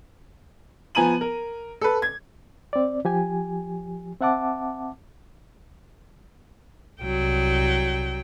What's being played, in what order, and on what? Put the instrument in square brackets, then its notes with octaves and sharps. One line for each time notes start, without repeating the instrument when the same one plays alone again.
[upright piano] F3 B3 G#5 A#5 D#7 F#7
A#4
A4 B4
G#6
[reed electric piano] C4 D5
F3 G4 G#5
C4 E5 F#5 A5 D6
[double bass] C2 [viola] F#3 G5